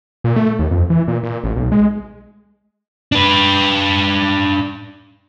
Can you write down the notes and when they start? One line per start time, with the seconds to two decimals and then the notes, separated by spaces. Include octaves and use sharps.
0.24 A#2
0.36 A3
0.59 D#2
0.71 F2
0.90 E3
1.08 A#2
1.23 A#2
1.44 A1
1.56 B1
1.72 G#3
3.12 D4 B4